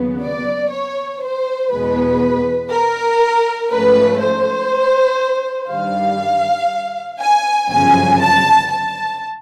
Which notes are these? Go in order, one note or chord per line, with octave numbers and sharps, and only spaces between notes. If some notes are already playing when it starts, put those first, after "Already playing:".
Already playing: D#2 C#3 F#3 B3
D5
C#5
C5
E2 B2 G#3 B3 B4
A#4
G#2 F3 A3 C#4 B4
C5
G2 D#3 G3 F5
G#5
G1 F#2 C#3 F3 G#5
A5
A5